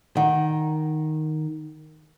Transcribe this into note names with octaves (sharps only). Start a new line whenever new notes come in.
D#3 F#5